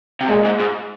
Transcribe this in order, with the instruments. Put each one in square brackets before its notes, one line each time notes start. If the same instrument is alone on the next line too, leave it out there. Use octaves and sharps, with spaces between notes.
[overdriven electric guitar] C3
[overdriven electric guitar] A#2 [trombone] G#3
[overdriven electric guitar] G#2
G#2